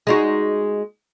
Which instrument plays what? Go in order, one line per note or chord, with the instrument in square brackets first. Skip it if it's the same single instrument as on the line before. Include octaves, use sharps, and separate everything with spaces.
[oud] G#3 D#4 F#4